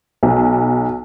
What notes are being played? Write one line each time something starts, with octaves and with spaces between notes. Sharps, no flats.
B1